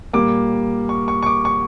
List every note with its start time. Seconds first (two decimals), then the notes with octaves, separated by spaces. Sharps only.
0.13 A#2 G3 A#3 D6
0.89 C#6
1.08 C#6
1.23 C#6
1.26 D6
1.45 C#6